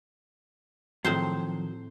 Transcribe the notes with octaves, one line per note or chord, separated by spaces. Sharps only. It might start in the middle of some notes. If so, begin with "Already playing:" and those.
A2 D#3 F3 F#3 C4 C5